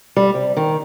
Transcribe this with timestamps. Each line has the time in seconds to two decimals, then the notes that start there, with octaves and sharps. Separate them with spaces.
0.16 G3
0.34 C3
0.57 D#3